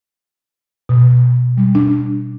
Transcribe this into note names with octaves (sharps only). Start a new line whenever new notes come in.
B2
G3
D4